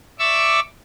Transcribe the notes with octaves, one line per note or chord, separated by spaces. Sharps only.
D5 E5 C#6 D6 E6